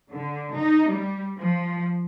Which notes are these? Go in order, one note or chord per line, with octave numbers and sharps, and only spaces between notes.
D3
D#4
G3
F3